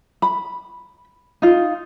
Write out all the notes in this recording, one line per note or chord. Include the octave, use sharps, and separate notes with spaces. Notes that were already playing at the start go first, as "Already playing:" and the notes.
B5
D#4 F4